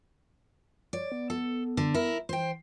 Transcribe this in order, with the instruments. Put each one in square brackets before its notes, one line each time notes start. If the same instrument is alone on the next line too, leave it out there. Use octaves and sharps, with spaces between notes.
[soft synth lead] C#5 [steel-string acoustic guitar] D5
[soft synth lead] B3
[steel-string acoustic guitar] A4
D3
E4 A#4
[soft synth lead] E3 [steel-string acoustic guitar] C5 G5